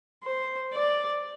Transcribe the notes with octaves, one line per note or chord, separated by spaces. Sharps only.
C5
D5